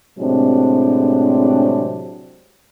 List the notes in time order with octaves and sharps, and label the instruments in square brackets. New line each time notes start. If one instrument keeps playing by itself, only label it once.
[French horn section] A2 C3 F#3 G#3 C4 D4